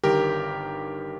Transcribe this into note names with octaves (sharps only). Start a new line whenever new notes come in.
G1 G2 D#3 G4 A#4